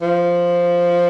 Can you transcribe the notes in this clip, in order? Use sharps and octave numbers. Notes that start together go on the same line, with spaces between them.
F3